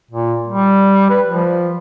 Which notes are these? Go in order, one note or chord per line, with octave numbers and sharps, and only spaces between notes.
A#2
G3
B4
F3